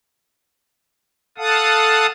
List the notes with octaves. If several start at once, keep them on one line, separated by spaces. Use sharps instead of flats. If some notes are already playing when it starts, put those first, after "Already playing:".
A4 F5 F#5 A5 D#6